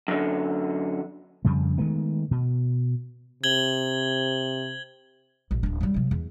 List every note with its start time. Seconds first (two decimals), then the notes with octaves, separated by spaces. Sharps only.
0.08 F#2 D3
1.45 F2 C#3 G3
1.78 D#3 G#3 A3 B3
2.31 B2
3.44 C3 G#6 F#7 G7
5.51 A#1
5.63 D1 D4
5.81 F#3 G3
5.94 C3 F#3
6.11 E2